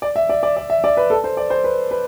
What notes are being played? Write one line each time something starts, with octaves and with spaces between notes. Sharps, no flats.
D5
E5
D5
D5
D5
E5
D5
B4
A4
C5
D5
C5
B4
B4